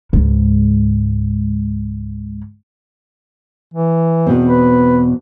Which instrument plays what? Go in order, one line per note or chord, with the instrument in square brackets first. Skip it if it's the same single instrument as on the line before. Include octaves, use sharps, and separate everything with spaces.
[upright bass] C#2 G#2
[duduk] E3
[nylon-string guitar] E2 B2 C4
[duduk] B4